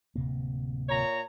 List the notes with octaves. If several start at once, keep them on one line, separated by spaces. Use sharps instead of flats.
D1 C3 A#3
A#2 C#5 A#5